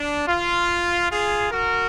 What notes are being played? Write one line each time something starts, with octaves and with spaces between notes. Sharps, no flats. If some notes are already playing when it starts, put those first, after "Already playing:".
Already playing: D4
F4
F4 G#4
F#4 A#4